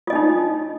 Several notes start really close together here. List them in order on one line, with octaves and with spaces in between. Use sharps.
F4 D#5 D4 D#4